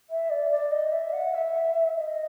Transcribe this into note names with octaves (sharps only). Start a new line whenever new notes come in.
E5
D5
D5
D#5
E5
F#5
E5
D#5